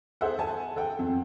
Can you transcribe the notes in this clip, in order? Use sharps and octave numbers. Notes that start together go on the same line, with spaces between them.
G#4 A4 C5 E5 F#5
G#5 A5
A4 F#5 G5
F2